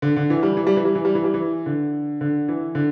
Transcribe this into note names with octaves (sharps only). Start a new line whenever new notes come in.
D3
D3
E3
G3
E3
G3
E3
G3
E3
G3
E3
G3
E3
D3
D3
E3
D3